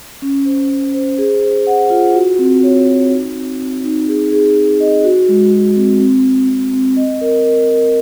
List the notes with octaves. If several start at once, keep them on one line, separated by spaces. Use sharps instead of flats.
C#4
C5
C#4
C5
G#4
C5
F#5
F4
F#4
C4
C#5
F#4
D#4
C4
C4
D#4
G#4
G#4
G#4
D#5
F#4
G#3
F#4
C4
C4
C4
C4
C4
D#5
A#4
A#4
A#4